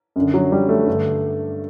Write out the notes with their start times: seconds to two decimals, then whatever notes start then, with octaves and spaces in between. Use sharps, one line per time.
0.16 F#2 D3
0.34 F#3
0.52 G3
0.69 A3
0.87 G2 D3